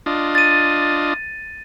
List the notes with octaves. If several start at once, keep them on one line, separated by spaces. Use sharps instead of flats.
D4 F4 D#5
A6 D#7